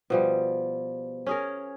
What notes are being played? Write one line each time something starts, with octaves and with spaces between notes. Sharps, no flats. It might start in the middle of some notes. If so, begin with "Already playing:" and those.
B2 F3 G3
C#4 G#4 A#4